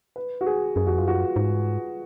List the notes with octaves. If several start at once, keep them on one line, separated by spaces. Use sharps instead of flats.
B4
F#4
G#4
F#2 G#4
F2 F#4
F#2 F4
F#4
G#2